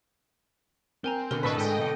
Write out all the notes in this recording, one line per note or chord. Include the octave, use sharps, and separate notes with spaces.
C4 A#4 G#5 A#5
B2 D3 A#4
A2 A4 B4 C5 D#5 C#6 E6 B6
G#2 D#5 G5
B2 A4